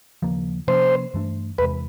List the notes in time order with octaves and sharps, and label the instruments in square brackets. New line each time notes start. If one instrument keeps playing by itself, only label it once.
[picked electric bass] D#2 C#3 F3 A#3
[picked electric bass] C3 F3 A#3 C#4 [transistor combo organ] C5
[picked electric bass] G2 E3 A3 D4
[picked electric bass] E2 C3 E3 G#3 [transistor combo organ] B4